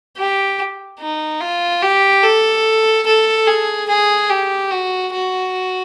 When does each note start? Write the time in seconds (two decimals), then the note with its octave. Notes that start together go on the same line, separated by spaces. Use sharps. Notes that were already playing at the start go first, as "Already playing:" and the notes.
0.17 G4
1.00 D#4
1.41 F4
1.82 G4
2.23 A4
3.06 A4
3.47 G#4
3.89 G#4
4.30 G4
4.71 F#4
5.13 F#4